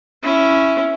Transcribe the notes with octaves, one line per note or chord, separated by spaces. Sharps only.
C#4 E4